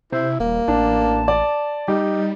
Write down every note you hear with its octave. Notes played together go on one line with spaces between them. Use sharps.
C3 E4 C5
D#1 G3 A#3
A1 D4 A5
D5
G3 D#4 G4